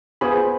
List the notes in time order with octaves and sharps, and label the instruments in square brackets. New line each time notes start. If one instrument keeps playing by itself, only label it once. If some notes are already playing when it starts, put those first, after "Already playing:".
[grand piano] B3 [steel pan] F4 G#4 C5 G#5 B5